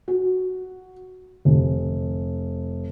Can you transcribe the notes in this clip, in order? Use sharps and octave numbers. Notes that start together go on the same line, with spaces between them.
F#4
F1